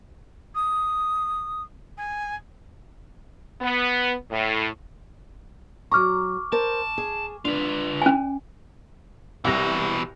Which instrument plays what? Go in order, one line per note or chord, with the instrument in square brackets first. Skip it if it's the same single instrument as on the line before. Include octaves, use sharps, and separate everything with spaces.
[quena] D#6
G#5
[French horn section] B3
A2
[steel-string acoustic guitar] F#3 A#5 [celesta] C#6 D6 F6
[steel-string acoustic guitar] A#4 C5 [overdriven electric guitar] A5
[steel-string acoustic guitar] G#4
[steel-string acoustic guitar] D4 [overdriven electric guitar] F4 B4
[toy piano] C#4 G#5
[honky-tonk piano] C2 A#6 [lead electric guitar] B2 E3